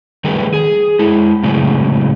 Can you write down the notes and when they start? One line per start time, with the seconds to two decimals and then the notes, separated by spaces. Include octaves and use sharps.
0.24 D#3 G3 A3 G#4 A#4 B4
0.54 G#4
0.99 G#3 E4
1.43 A2 C#3 F#3 G#3